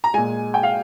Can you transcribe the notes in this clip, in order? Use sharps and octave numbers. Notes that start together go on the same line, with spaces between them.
A#5
A#2 G#3 G#5
G5
F5